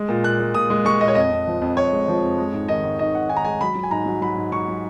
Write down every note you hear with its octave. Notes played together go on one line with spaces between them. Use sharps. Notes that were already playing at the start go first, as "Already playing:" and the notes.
Already playing: G#3
A#2
A#2 F#6
G#3
A#2 D#6
G#3
G#3 C#6
A#2 D#5
C#5
F2 D#5
F2
F3
F2
F2 C#5
G#3
F3
F2
G#3
G#2
D#3 D#5
G#2
G#2 D#5
D#3 F#5
D#3 G#5
A#5
G#3 G#5
F#3 B5
F#3
G#5
G#2 A#5
F#3
F#3 B5
G#2
G#2 C#6
F#3